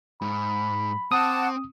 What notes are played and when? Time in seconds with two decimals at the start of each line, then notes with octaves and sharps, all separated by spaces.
0.22 G#2 B5
1.12 C4 F#5 A5 D6 D#6